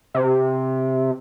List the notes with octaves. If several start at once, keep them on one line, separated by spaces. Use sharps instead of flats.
C3